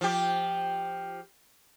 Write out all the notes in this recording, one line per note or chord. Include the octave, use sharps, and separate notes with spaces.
F3 G4